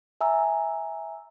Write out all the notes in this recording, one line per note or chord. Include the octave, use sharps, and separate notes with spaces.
E5 G#5 A#5 E6